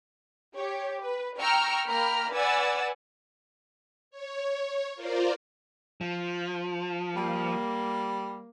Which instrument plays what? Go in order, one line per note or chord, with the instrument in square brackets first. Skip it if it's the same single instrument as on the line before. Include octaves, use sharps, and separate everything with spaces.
[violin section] G4 C#5
B4
G5 A#5 C#6 E6 F6
A#3 A#4 G5 A#5 B5 F6
B4 D5 F#5 G#5 E6 A6
[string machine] C#5
F4 A#4 C5 D5
[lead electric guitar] F3
[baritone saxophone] G3 [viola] A#3